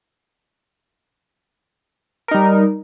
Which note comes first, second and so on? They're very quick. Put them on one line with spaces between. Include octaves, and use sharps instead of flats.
A#4 D#4 G3